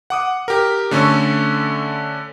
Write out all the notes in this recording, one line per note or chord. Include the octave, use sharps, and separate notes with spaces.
F#5 D6 D#6
G4 A#4
D3 A3 C#4 A4 C#6